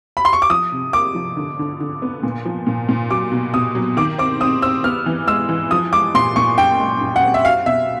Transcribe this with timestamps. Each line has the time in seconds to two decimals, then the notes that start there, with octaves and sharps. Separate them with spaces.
0.17 B5
0.25 C6
0.33 C#6
0.42 D6
0.50 F3 D#6
0.72 C3
0.93 A#3 D6
1.15 F3
1.37 D3
1.59 D3
1.80 D3
2.02 B3
2.23 A#2
2.45 F3
2.67 A#2
2.89 A#2
3.11 F#3 D6
3.32 B2
3.54 B2 D#6
3.75 F#3
3.97 D#3 D6
4.18 C4 D6
4.41 C4 D#6
4.62 C4 E6
4.84 B3 F6
5.06 E3
5.27 G#3 E6
5.49 E3
5.71 F3 D#6
5.92 G#3 D6
6.14 A#2 C6
6.36 A#2 C#6
6.58 F#2 G5
6.80 G#3
7.01 F#2
7.16 F#5
7.23 C4
7.34 E5
7.45 F#4 F5
7.66 B2 E5